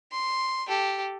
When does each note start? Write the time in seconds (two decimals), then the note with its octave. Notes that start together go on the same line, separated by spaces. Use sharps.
0.12 C6
0.68 G4 A4